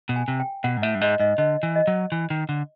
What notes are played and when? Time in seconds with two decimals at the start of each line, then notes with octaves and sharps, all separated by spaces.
0.09 B2
0.16 G#5
0.28 C3
0.40 G5
0.64 B2 F#5
0.77 G#2
0.82 A2 E5
0.95 G2
1.01 G#2 D#5
1.20 G#2 D#5
1.38 D3 D#5
1.63 E3
1.76 D#5
1.87 F#3
2.12 E3
2.30 D#3
2.49 D3